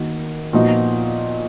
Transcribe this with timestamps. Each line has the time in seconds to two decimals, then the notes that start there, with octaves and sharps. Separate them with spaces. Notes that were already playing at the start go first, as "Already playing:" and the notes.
Already playing: D#3 A#3 D#4 F#4
0.53 A#2 F3 B3 D#4 F#4